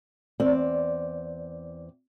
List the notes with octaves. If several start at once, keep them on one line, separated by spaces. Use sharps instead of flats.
E2 C4 D5